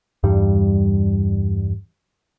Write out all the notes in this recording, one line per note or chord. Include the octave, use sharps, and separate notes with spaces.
E2 G2 G3